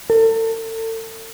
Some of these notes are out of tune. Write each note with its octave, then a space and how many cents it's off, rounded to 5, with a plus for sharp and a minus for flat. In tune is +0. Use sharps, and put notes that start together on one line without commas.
A4 +40